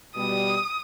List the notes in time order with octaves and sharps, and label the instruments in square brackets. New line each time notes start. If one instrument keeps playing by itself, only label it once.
[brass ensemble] B2 G3 [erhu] D#6